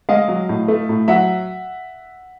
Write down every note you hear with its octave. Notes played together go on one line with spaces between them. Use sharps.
G#3 D#5 F5
F#3
A2
A3
A2
F#3 E5 F#5